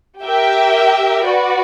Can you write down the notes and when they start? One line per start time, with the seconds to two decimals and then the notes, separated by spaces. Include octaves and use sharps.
0.21 G4 A#4 E5 G5
1.25 F#4 B4 D5